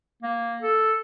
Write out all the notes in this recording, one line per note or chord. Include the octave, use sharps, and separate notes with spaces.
A#3
A4